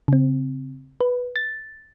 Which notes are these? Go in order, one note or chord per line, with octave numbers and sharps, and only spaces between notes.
C#3 C4
B4
A6